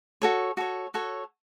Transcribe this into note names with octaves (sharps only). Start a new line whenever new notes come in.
F#4 A4 C#5
F#4 A4 C#5
F#4 A4 C#5